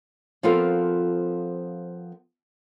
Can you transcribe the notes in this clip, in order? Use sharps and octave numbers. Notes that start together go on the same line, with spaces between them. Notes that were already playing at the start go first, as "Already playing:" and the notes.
F3 B3 C4 F4 A4 A#4